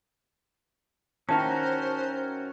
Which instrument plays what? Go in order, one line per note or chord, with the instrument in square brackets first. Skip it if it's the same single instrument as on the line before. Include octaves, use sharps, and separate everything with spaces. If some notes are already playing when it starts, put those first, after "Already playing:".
[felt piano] D#3 E4 [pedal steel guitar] C#4 F#4 A#4 [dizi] C5 [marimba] A5